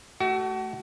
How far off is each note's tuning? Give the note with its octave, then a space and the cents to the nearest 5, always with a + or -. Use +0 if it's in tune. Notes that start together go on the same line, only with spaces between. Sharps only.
A3 -10 F#4 +30